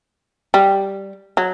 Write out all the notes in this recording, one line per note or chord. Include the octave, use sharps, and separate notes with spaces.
G3
F#3